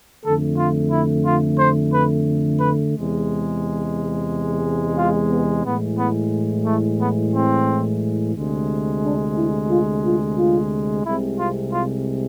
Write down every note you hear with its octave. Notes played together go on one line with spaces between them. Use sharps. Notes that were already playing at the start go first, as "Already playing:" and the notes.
F2 D3 A3 A4
F4
E4
F4
C5
B4
B4
E2 C3 G#3
F4
B3
A2 E3 G#3 B3
B3
A3
B3
C4
D2 C3 G#3
D4
E4
F4
F4
F4
C2 C3 G#3 E4
F4
F4